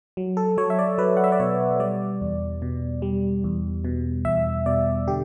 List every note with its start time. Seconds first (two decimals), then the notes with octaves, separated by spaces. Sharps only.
0.17 F#3
0.37 A4
0.57 F#3 C#5
0.70 E5
0.79 D5
0.98 F#3 B4
1.17 F#5
1.24 E5
1.32 D5
1.40 B2 C#5
1.80 G3 D5
2.21 E2
2.62 B2
3.02 G3
3.44 E2
3.85 B2
4.25 E2 E5
4.66 B2 D5
5.08 D3 G4